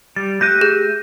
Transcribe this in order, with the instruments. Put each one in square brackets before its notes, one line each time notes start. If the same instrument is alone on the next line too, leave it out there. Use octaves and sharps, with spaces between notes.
[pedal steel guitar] G3 [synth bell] A6
[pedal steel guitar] A3 G4 F#6 [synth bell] G6 A#6 D#7
[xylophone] G#4